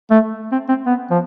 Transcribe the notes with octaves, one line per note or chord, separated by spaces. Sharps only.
A3
C4
C4
B3
F3